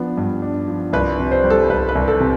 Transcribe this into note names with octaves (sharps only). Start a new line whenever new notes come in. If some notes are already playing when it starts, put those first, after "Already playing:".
Already playing: F3 B3 D4
G2
D4
F3
C2 B4
C3
C5
G3
A4
C2 B4
B4
C2
A4
C3